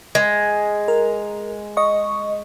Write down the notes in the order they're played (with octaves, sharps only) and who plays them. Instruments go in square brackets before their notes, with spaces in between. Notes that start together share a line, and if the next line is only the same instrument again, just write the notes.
[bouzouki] G#3
[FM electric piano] A#4
D#5 C#6